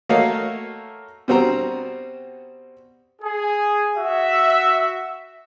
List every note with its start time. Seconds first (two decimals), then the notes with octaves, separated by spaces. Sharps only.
0.09 A3 A#3 F#4 C#5 D#5 F5
1.28 B2 G3 C4 F#4 C5 A#5
3.22 G#4
3.96 F#4 E5